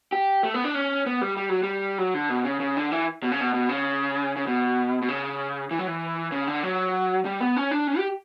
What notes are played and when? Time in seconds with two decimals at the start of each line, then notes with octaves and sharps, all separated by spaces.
0.12 G4
0.43 A3
0.54 B3
0.64 D4
0.75 C#4
1.06 B3
1.21 G3
1.37 G3
1.49 F#3
1.63 G3
1.98 F#3
2.14 D3
2.30 B2
2.45 C#3
2.60 C#3
2.77 D3
2.92 E3
3.23 B2
3.32 C#3
3.41 B2
3.54 B2
3.69 C#3
4.36 C#3
4.47 B2
5.02 B2
5.08 C#3
5.71 E3
5.79 F#3
5.88 E3
6.32 C#3
6.47 D3
6.63 F#3
7.25 G3
7.40 B3
7.56 C#4
7.71 D4
7.87 C#4
7.98 G4